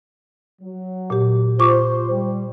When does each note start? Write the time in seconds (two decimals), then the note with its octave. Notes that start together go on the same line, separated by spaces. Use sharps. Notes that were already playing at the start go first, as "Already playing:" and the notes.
0.62 F#3
1.10 A#2 G4
1.59 F4 C5 C#6 D6
2.11 G3